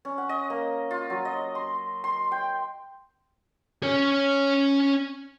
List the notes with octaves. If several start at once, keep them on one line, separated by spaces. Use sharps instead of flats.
C#4
F#5
D#5
A#3
F4
F#3
D#5
C6
C6
G5
C#4 C#5